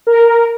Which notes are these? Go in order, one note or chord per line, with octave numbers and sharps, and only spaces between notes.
A#4